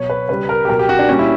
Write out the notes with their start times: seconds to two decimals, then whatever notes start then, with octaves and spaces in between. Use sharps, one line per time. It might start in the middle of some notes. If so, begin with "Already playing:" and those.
Already playing: B2 F#3 C#5
0.10 B4
0.29 C#3 G3 B4
0.49 A#4
0.65 G4
0.68 B2 F#3 A#4
0.79 G4
0.89 F#4
0.99 D4
1.09 A#2 G3 C#4
1.19 E4